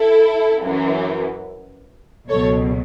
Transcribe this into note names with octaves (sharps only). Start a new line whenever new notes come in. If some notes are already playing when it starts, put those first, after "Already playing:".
Already playing: E4 A4
F#2 E3
C#2 B2 F#3 A4 C#5